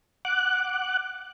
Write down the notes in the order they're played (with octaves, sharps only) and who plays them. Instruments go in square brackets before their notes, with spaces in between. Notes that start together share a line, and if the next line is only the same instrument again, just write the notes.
[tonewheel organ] F#5 D6 F#6